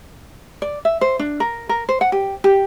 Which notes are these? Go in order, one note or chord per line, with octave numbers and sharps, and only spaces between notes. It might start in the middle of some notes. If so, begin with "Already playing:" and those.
D5
E5
C5
D4
A#4
A#4
C5
F#5
G4
G4